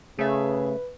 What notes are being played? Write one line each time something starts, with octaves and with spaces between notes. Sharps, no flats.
C#3 A3 G#4 B4 E5